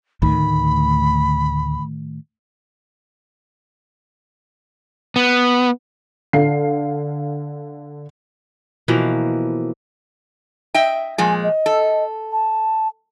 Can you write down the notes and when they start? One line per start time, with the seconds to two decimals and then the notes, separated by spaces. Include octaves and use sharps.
0.22 D2 A2 D#3 B5
5.16 B3
6.33 D3 F5 C7
8.88 B2 E3 F3 A#3
10.74 D#5 E5 G5
11.18 A#2 F3 G#3 G#5
11.44 D#5
11.66 A4
12.32 A5